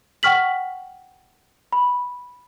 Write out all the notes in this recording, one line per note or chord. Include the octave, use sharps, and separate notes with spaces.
F#5 G5 C#6 F6 B6 F#7
B5